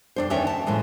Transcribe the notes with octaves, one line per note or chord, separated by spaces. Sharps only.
F2 D4 C5
E2 D#3 C#4 E5 G5
D2 A5
A2 E3 F3 G#3